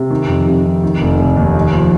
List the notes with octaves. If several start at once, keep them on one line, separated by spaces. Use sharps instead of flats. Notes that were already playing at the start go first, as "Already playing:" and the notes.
Already playing: C3
D#3
F2
C3
D#3
D#3
F1
F1
D#2
D#4
F3